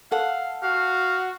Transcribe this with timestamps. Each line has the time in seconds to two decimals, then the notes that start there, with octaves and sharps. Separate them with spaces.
0.12 A4 F5 F#5
0.63 F#4 F5